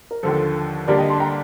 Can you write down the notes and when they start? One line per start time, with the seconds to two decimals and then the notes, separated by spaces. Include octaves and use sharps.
0.11 A#4
0.23 D#2 D3 F3 A4 C5
0.87 D3 G3 A#3 D4 G4 A#4 D5
0.98 D#5 G5
1.10 A5 C6
1.20 G5 A#5